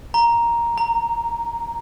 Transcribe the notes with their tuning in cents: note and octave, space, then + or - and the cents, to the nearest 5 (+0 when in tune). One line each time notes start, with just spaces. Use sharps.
A#5 +5
A#5 -20